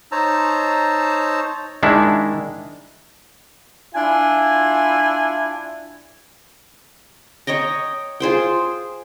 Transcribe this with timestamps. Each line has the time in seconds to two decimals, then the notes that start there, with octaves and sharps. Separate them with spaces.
0.12 D#4 C5 C#5 A5 A#5 E6
1.83 D#3 G#3 D4 E4
3.95 D4 E4 F4 G#5
7.47 C#5 D#5 G5 A#5
8.20 F4 G#4 C5 G5